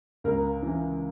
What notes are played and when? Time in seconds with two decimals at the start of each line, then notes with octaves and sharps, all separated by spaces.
0.24 C#2 A#4
0.62 C#3 E3